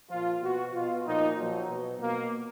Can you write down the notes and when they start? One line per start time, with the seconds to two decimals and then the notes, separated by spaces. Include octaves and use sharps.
0.10 A#2 F3 F4
0.42 B2 F#4
0.73 B2 F4
1.05 A#2 F3 D#4
1.37 A#2 F3 F#3
1.68 B2
2.00 B2 A#3